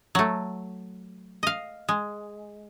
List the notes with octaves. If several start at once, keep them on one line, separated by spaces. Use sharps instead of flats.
F#3 A3
D#5 F5
G#3